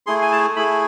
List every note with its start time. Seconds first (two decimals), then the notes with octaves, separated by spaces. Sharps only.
0.06 A3 E4 G#4 C6
0.22 G#5
0.32 A5
0.56 A3 E4 G#4 B5